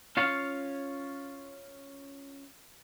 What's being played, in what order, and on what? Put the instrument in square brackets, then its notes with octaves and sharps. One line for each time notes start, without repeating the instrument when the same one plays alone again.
[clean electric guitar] C#4 F4 C#5 F5